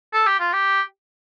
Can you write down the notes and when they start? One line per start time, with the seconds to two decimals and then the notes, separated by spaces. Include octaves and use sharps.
0.13 A4
0.26 G4
0.40 F4
0.53 G4